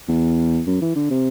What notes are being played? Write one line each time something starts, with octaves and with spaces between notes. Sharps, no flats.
E2
F#2
E3
D3
C3